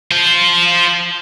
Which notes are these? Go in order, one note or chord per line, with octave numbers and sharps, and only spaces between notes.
F4 C5